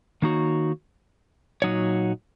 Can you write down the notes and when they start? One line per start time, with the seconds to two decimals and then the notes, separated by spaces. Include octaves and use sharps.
0.22 D#3 A#3 D#4 F#4 C#5
1.62 A#2 F#3 D#4 F#4 C#5